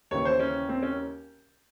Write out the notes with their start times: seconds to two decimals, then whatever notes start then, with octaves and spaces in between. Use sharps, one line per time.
0.11 D#2 C#3 E3 C#5
0.25 C5
0.40 C#4
0.69 C4
0.82 C#4